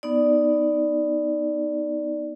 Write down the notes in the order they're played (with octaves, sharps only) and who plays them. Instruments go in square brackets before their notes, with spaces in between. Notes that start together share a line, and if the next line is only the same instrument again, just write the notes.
[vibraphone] B3 D#4 D5